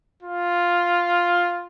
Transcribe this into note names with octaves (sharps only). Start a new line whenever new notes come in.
F4